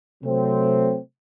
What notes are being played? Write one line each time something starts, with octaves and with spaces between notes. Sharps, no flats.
C3 F#3 A3 C4